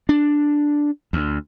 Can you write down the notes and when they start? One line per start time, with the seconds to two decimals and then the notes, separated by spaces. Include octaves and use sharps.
0.09 D4
1.13 D2